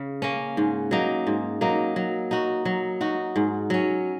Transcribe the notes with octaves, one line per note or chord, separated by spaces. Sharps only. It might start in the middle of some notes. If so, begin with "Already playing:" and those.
Already playing: C#3
A#3 C#4
G#2
F#3 A#3 D#4
G#2
F#3 A#3 D#4
F#3
D#4 F#4
F#3
D#4 F#4
G#2
F#3 C#4